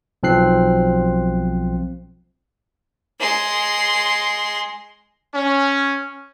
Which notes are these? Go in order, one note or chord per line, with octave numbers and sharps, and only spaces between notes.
B1 F3 C4 F#6 C7
G#3 C6
C#4